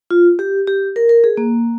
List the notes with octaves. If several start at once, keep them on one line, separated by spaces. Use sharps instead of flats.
F4
G4
G4
A#4
A#4
G#4
A#3